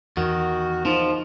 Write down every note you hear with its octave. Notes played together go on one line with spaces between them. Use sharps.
E2 D#3 F#4
F3 D#4 F4